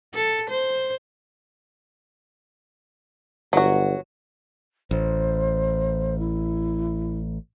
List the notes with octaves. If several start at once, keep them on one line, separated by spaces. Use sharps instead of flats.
A4
C5
G1 F#3 F#4
A1 C5
E4